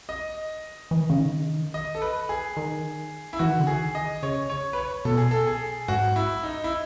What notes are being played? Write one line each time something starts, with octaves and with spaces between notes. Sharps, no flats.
D#5
E3
D#3
C#3
D#3
D#5
A4
B4
G#4
D#3
E4
E3 F#4
D#3
C#3
D#3 G#4
D#5
C#3 C#5
C#5
B4
C#5
B2 A4
G#4
A4
G#4
G#2 F#4
E4
D#4
E4